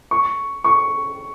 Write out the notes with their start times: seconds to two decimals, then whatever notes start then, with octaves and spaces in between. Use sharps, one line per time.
0.11 C#6
0.64 C#6